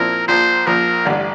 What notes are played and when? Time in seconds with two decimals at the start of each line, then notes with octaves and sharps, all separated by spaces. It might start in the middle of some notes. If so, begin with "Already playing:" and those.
Already playing: A#2 F3 C4 E4 A#4
0.28 A#1 A#2 F3 C5
0.66 A#1 A#2 F3 A#4
1.05 A1 G2 D3